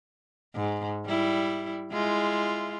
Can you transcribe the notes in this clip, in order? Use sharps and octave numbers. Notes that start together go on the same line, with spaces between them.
G#2
G3 E4
G#3 E4 F4